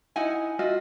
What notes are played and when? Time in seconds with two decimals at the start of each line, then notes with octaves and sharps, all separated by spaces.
0.16 D#4 E4 F#5 G#5
0.59 F4 F#4 D#5 E5